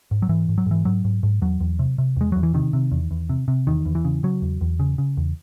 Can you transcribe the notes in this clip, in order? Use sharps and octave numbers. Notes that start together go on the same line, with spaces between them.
G#2
F#3
G#2 E3
G#2
F#3
G#2 E3
G#2 F#3
G#2
G#2
E2 F#3
E2
C3
C3
E2 G#3
E2 F#3
E3
C3 D#3
C3
E2
E2
C3
C3
E2 D#3
E2
E3
C#3
C#3 F#3
E2
E2
C#3
C#3
E2